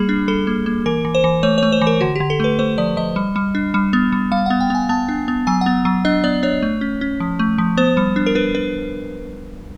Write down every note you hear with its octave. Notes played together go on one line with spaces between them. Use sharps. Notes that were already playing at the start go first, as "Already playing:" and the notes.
Already playing: G3 A#3 G#4
D4
G3 A4
A#3
A#3
E3 A#4
E3
C5
E3
A3 C#5
A3 C#5
C5
E3
A#4
D3 F#4
D3 G4
A4
A3 B4
A3 C5
F3 D5
F3 D#5
G3
G3
D4
G3
B3
G3
G3 F5
B3 F#5
G5
B3 G#5
B3 A5
D4
B3
F#3 G#5
B3 F#5
F#3
D4 D#5
B3 D5
D4 C#5
A3
C#4
C#4
F3
A3
F3
B3 C5
G3
D4
A#4
D4 B4
D4 B4